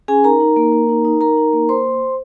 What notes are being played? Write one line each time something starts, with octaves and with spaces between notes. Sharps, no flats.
C#4 G#4 G#5
D#4 A#4 A#5
D#4
A#3
A#3
D#4
D#4
D#4 A#4 A#5
D#4
A#3
A#3 C5 C6